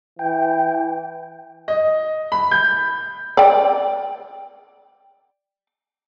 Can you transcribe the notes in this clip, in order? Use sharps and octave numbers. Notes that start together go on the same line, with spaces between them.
E3 G5
D#5
B5
G6
D5 G5